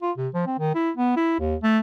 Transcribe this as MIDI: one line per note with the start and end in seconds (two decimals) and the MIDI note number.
0.02 0.11 65
0.17 0.28 48
0.34 0.42 53
0.46 0.57 60
0.59 0.73 51
0.75 0.91 64
0.97 1.15 59
1.16 1.36 64
1.39 1.55 39
1.63 1.79 57